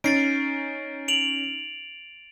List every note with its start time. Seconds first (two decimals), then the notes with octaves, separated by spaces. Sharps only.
0.04 C#4 D#4 A6 C7 D7
1.08 D7 F7 F#7